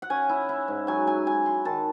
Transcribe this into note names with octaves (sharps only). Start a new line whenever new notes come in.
F#5
C#4 G#5
E4
E4
G#2
F#3 G#5
E4 G#5
F#3 G#5
E4 C6
D#3 A5